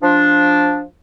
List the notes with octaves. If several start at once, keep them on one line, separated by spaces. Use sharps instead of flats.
F3 D4